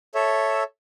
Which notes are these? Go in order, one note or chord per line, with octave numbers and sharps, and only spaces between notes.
A4 C#5 E5